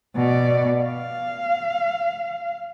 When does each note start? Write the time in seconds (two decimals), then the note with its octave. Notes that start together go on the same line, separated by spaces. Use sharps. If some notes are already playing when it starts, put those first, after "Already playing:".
0.16 B2 D5
0.84 F5